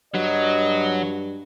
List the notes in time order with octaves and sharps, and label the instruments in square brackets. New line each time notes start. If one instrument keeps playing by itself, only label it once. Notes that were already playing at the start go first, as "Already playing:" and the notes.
[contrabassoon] G2 [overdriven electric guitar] F#3 [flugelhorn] D#5